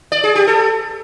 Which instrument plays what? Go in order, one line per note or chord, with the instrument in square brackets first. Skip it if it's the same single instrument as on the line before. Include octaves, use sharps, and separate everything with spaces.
[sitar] D5
G#4
G4
A4